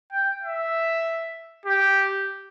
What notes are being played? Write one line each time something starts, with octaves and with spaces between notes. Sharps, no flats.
G5
E5
G4